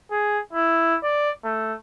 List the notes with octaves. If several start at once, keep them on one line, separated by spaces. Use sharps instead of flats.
G#4
E4
D5
A3